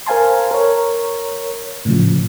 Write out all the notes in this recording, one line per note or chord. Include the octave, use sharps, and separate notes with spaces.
A#4 C5 F5 G#5 A5 C6
A#4 C#5
A2 C#3 F3